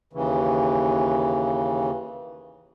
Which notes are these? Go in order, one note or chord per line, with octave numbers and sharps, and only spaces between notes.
D#2 C#3 E3